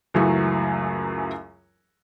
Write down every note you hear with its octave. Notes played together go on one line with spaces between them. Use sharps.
C#2 F#2 E3 F#3 A3 G#5